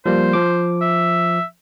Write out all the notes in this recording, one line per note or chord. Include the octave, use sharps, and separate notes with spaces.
F3 G3 A#3 C5
F3 D6
E5